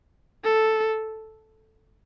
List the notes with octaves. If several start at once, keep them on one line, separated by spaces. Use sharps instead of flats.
A4